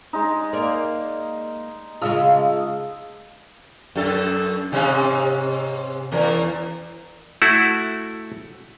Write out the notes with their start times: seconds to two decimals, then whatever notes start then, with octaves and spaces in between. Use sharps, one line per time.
0.13 G#3 D#4
0.53 A#3 D5
2.02 C#3 G#3 F4 A4 D#5 F5
3.96 F#2 A4
4.72 G#2 C3 C#4
6.12 E2 C#4 A#4
7.42 A3 E4 F#4